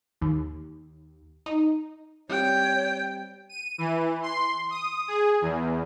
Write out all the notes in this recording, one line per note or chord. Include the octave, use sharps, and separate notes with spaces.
D#2
D#4
G3 C4 G4 C#5 G5
D#7
E3
C6
D#6
G#4
E2